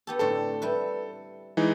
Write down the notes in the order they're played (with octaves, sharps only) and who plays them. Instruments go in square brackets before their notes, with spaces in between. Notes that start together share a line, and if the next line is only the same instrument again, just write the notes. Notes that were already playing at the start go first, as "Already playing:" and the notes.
[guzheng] B3 G4 A4
[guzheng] A2 D3 C4 [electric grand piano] A4
[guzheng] G3 E4 B4
[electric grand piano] E3 G#3 D#4